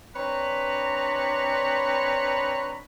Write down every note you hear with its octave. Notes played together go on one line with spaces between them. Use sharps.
C4 D4 B4 C#5 A#5 B5